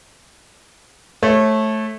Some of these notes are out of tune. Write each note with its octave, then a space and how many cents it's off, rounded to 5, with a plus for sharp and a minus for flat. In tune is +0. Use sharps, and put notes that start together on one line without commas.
A3 -10 C#5 -30